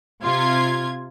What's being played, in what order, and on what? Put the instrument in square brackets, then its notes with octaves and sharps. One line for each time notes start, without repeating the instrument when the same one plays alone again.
[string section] C3 F4 G#6